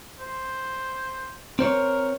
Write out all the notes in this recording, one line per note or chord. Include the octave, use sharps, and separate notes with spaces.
C5
C4 A#4 C5 C#5